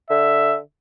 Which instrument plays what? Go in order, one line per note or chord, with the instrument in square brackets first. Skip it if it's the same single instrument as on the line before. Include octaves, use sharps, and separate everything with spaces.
[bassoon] D3 [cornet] E5